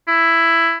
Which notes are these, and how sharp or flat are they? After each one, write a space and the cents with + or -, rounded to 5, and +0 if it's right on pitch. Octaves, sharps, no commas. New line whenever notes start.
E4 +10